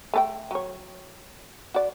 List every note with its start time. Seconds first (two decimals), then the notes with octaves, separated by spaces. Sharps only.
0.14 A3 A4 G5
0.51 F#3 C#5
1.74 F#4 D5